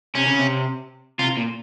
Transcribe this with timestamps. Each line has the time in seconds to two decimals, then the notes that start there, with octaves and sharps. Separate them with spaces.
0.15 C3 C#4
0.26 C#3
0.39 C3
1.19 C3 F4
1.37 A#2